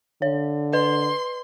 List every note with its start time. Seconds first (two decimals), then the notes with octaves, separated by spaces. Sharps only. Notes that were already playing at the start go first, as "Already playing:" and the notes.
0.22 D3 C#5
0.73 B4 C6